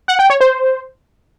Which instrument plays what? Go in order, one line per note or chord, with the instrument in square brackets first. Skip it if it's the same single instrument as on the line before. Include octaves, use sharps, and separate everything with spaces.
[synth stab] F#5
G5
C#5
C5